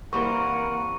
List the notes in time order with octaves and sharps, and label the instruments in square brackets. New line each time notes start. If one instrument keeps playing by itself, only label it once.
[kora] E3 G3 C4 [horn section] A#3 A#4 [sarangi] F#5 [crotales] C#6